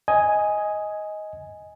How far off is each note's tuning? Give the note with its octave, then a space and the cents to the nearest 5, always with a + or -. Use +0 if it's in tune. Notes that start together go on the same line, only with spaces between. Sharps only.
D#5 +10 G#5 +0